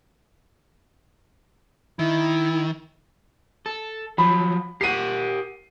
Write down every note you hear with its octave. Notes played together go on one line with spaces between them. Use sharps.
D#3 E4
A4
F3 F#3 B5
G4 A#4 F#5 C7 D#7